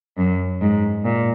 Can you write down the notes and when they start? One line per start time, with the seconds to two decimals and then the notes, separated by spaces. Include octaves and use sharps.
0.18 F#2
0.61 G#2
1.04 A#2